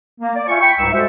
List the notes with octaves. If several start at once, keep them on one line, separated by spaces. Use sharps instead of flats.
A#3
D5
F4 E5 G5 G#5 C#6
G5 B5 C#6
C#2 G#2 G3 D#4 C#6 E6
G#3 F#4 A4 C5 E5